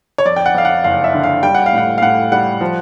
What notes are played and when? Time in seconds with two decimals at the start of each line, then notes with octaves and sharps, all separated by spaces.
0.18 C#5
0.26 F2 D5
0.36 G5
0.46 F#5
0.55 F2 F5
0.65 F#5
0.84 F#1 F5
1.04 E5
1.14 D3
1.24 F5
1.43 G3 G5
1.55 F#5
1.66 F5
1.73 A2
1.78 F#5
1.98 F5
2.02 A2 F#5
2.32 G3 F#5
2.61 F3